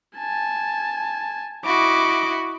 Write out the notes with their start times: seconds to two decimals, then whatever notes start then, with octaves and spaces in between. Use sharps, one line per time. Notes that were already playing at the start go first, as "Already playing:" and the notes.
0.17 G#5 A5
1.65 E4 F#4 D#5 D6